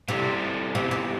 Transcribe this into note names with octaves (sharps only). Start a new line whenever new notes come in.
C3 G3 C4 E4 A4 D5
G2 C3 E3 G3 B3
C3